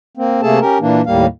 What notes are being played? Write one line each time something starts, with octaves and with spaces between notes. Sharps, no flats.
A#3 C4
C3 A3 A#3 G#4 A4 A5
C#4 G4 A#4
A#2 E3 A#3 D4
D#2 A2 G3 A#3 F5